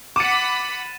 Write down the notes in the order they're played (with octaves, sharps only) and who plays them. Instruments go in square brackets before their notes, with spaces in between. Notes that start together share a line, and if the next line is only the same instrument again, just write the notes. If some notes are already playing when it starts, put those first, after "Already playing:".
[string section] F#5 B5 [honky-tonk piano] D6 C#7 [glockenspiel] A6 D#7 E7